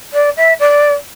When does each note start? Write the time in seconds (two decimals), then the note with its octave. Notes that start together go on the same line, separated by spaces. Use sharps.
0.13 D5
0.37 E5
0.60 D5